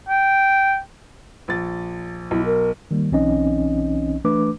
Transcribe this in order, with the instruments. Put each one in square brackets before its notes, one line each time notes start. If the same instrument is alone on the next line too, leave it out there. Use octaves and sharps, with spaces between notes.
[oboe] G5
[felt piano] A#1 A6
[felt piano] B1 [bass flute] E4
[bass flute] A#4
[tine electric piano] D#3 G3 A#3
B1 E3 C4 C#4 D#4 D#5
E3 A3 D4 B4 D6